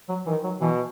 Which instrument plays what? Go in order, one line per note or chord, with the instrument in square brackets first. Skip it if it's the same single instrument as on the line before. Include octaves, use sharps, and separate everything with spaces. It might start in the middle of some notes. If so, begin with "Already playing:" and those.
[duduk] F#3
[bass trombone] D#3 [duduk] E3
[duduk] F#3
[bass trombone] B2 [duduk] E3